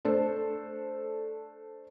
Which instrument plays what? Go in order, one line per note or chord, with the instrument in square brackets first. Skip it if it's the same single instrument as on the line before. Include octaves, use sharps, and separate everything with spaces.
[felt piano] A3 D4 A4 C5